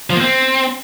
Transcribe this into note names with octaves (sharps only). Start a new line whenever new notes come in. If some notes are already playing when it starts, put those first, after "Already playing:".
F3
A#3
C4